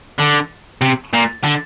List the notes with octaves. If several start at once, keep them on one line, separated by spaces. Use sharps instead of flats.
D3
C3
A#2
D3